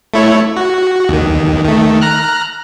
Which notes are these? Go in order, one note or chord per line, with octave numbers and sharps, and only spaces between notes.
A3 E4 C#5
F#4
D#2 D#3
D#3 A3
A#5 F6 F#6